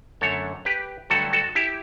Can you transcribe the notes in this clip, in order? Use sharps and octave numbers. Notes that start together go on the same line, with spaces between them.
F#2 D3 F#3 A3 A4 C#5
G4 B4
G2 D3 F#3 A3 F#4 A4
F#4 A4
E4 G4